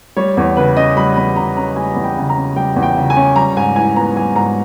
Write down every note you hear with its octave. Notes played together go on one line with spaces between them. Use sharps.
G3 C#5
E2 C#5
C#3 B4
C#4 D#5
G3 B5
E2 B5
C#3 A#5
C#4 A#5
G3 G#5
E2
G5
C#3
A#5
C#4
G3 G5
E2
G5
C#3
G#5
C#4
G3 A#5
G#2 G#5
E3 G#5
B3 A#5
G3 G#5
G#2 A#5